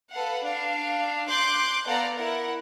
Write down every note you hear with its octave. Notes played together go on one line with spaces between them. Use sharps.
A4 B4 F5 F#5
D4 F5
C6 D6 F#6 G6
B3 A4 D5 F5 F#5 A#5
E4 A#4 F#5